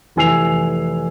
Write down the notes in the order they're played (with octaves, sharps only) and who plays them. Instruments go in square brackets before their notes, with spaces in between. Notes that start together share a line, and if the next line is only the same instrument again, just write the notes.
[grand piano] F1 E3 G#5 E6 C7 F7